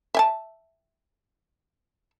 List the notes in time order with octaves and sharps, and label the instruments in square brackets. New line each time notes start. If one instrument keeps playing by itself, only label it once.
[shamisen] E5 G#5 A5